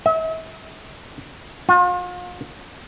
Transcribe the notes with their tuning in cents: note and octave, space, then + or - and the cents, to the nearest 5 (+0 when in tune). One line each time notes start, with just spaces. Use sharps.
E5 -40
F4 +40